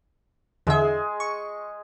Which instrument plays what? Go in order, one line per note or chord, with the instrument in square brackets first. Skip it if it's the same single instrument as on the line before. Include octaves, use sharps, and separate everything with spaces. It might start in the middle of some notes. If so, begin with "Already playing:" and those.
[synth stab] E2 D3 E5 [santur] G#3 G#4
[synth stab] C#6